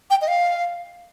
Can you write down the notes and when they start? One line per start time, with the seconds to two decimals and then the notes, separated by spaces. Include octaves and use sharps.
0.10 G5
0.22 D#5
0.28 F5